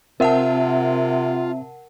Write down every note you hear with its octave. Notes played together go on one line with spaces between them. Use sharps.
C3 C4 F4 A#4 E5 F#5 A5